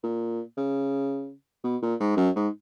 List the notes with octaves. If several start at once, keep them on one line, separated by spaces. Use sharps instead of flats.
A#2
C#3
B2
A#2
G#2
F#2
G#2